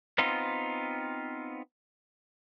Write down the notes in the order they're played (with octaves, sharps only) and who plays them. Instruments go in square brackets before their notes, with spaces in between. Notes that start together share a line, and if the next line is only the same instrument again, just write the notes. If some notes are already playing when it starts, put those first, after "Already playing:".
[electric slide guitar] B3 C4 D#4 F4